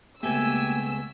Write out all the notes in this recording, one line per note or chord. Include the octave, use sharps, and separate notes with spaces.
C#2 B2 A3 A#3 G4 G#5 E6